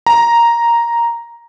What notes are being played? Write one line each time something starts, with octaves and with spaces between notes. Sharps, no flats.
A#5